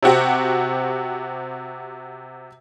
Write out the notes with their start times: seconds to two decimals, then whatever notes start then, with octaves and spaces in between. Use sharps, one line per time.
0.03 C3 C4 F#4 G4